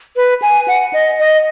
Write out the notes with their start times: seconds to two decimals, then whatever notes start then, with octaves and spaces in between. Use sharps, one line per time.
0.16 B4
0.42 G#5
0.68 F#5
0.93 D#5
1.19 D#5